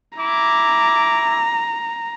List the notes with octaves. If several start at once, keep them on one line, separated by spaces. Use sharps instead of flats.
E4 A#5 D6